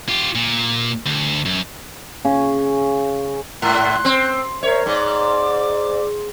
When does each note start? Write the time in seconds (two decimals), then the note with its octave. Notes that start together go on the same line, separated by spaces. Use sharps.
0.09 F4 G4
0.35 A#2
1.06 D2
1.46 F#2
2.25 C#3
3.62 G#2 C6 F#6
4.05 C4
4.63 A#4 C5 C#5 E5
4.86 G#2 D5 D6